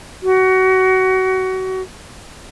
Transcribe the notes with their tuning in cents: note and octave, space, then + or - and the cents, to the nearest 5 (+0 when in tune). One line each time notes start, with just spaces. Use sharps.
F#4 +25